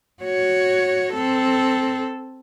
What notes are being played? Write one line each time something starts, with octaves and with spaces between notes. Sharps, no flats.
F#4 C#5
C4 A4